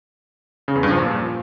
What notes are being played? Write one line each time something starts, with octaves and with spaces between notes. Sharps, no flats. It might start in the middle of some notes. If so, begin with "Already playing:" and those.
C#3
E2
G2
F3
A#2